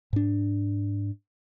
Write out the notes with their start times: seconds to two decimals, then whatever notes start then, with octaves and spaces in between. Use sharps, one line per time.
0.13 G#2 D4